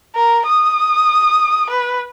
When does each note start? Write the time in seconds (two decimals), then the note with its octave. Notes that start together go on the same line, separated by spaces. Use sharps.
0.16 A#4
0.46 D#6
1.70 B4